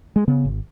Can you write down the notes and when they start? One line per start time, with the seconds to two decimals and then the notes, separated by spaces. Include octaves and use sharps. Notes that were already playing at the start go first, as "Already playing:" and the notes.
0.16 G#3
0.28 C#3 B3
0.45 G#1